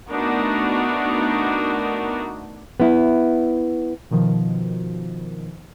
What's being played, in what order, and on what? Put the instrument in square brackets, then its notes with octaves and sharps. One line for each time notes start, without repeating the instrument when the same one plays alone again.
[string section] A3 B3 D4 D#4 F#4 A#4
[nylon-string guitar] B3 E4
[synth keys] B2 D#3 F3